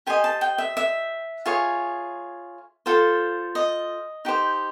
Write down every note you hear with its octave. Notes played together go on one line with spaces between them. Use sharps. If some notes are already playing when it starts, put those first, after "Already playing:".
G4 C5 D#5 G#5
A5
G5
E5
E5
F4 G#4 C#5
F4 A4 C5
D#5
D#4 G4 C5